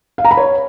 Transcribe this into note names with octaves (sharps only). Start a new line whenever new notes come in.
F5
A#5
B5
C#5